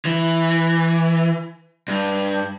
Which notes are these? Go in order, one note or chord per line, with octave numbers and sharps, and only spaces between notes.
E3
G2